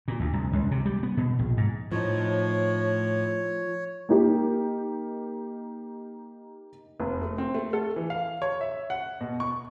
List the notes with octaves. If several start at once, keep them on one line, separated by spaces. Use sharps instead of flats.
A#2
D2
C2
C#2
C3
G3
B3
B2
A#1
G#2
A2 F3 D#4 C#5
A#3 D#4 G4
F1
A3
C4
A3
A4
E3
F5
C#5
E5
F#5
B2
C#6